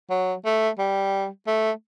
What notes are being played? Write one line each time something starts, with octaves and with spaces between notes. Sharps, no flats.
F#3
A3
G3
A3